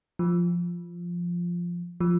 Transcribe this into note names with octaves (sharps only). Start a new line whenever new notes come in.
F3
F3